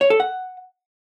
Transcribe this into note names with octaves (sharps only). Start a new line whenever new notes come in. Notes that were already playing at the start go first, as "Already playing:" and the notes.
C#5
A4
F#5